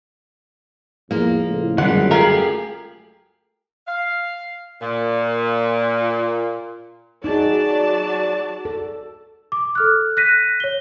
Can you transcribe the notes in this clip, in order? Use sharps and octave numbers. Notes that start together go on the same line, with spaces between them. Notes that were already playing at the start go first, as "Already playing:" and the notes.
E2 F3 A#3
C#2 A2
C#2 F#2 D3 G3 D4 F#5
A3 F4 G4 G#4 A#4 F5
F5
A#2
F#3 D#4 G#4 D5 A5
A4
D6
A4 F6 F#6
F#6 A#6 B6 D#7
C#5 G7